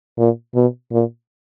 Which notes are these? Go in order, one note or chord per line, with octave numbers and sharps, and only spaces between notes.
A#2
B2
A#2